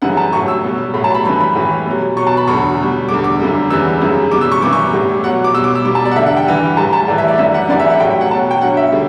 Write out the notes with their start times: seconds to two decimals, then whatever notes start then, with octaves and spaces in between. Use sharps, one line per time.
0.02 F#2 C#3 E3 G3 F#5
0.17 A5
0.33 A2 F#3 C#6
0.48 E6
0.64 B2 G3
0.94 A2 B5
0.97 F#3
1.04 A5
1.14 B5
1.25 F#2 E3 G3 B5
1.40 B5
1.56 A2 E3 G3
1.86 B2 F#3
2.17 B2 F#3 C#6
2.27 A5
2.37 B5
2.47 E2 D3 F#3 C#6
2.78 B2 G3
3.09 E2 D3 G3 D6
3.24 D6
3.39 F#2 D3 G3
3.70 E2 C#3 E3 G3 E6
4.01 F#2 C#3 G3
4.31 G3 D6
4.35 B2
4.41 E6
4.52 C#6
4.62 F#2 E3 G3 D6
4.72 C#6
4.93 A2 G3
5.23 B2 F#3 F#5
5.44 D6
5.54 B2 E6
5.57 G3
5.64 D6
5.75 E6
5.85 G3 D6
5.90 B2
5.95 A5
6.05 D5
6.11 F#5
6.16 E2 D3 G3 E5
6.26 F#5
6.37 G5
6.46 G2 E3 G3
6.77 A2 G3 A5
6.93 A5
7.08 A2 E3 G3 D5
7.18 E5
7.28 D5
7.38 F#2 E3 G3 E5
7.54 F#5
7.69 F#2 C#3 E3 G3 D5
7.80 E5
7.90 F#5
8.00 A2 F#3 G5
8.10 G5
8.21 F#5
8.31 B2 F#3 A5
8.51 G5
8.61 G2 F#3 F#5
8.77 E5
8.92 D3 G3